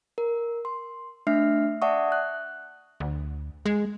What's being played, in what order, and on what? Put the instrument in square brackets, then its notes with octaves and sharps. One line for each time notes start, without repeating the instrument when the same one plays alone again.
[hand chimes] A#4
C6
A3 D4 E5 F6 C7
D5 E5 F#5 A5 C#6 D#6
F#6
[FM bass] D2
G#3